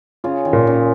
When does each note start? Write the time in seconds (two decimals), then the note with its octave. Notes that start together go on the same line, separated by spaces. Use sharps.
0.24 C#3 F4
0.45 D#3
0.53 A#2
0.67 C#3